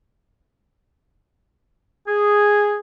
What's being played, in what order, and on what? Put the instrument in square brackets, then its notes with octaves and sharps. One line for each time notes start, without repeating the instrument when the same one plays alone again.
[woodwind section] G#4